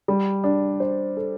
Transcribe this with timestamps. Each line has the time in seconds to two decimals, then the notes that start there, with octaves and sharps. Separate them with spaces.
0.08 G3
0.44 D4
0.80 C5
1.17 A4